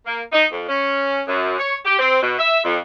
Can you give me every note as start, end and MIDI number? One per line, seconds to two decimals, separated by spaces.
0.06 0.22 58
0.32 0.45 63
0.52 0.67 41
0.69 1.22 61
1.28 1.55 42
1.59 1.75 73
1.85 1.97 67
1.99 2.20 60
2.22 2.37 47
2.39 2.62 76
2.64 2.77 41